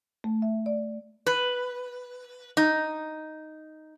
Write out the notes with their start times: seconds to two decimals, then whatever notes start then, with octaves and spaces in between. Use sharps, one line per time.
0.24 A3
0.42 E5
0.66 D5
1.26 B4
2.57 D#4